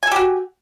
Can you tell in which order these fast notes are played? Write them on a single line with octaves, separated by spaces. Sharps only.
G#5 A4 G4 F#4